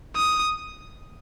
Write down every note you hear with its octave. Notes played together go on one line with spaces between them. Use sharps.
D#6